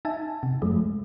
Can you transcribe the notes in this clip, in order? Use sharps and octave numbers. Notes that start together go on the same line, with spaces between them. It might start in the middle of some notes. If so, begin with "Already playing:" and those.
D#4 E5 G#5 A5
C3
F#2 F3 G#3 A3